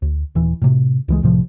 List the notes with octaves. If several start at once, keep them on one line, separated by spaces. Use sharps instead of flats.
D2
D#1 E3
A2 C3
C#2 E3 G#3
C2 A2 C3 F3